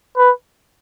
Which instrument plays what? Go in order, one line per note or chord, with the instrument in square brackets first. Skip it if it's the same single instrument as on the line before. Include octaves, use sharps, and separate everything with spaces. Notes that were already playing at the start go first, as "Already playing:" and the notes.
[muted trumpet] B4